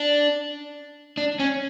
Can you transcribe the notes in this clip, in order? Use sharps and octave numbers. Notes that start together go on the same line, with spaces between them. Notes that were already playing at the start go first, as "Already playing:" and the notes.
Already playing: D4
D4
C#4